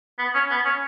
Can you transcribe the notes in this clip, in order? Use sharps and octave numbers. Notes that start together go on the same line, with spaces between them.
B3
C#4
B3
C#4